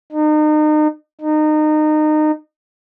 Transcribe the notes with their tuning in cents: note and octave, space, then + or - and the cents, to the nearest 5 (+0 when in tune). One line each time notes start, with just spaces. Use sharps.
D#4 -35
D#4 -25